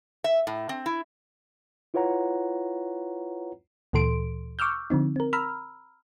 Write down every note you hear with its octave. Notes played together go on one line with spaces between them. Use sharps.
E5
A2
C4
E4
E4 F4 B4 C#5 F#5 A#5
D2 A#2 E3 A4 C6 D7
C#6 D6 E6 F6 G6
D3 F3 C4 D#4
C4 A#4
A#5 B5 E6 F6